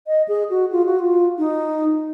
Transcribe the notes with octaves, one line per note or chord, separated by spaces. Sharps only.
D#5
G#4
F#4
F4
F#4
F4
D#4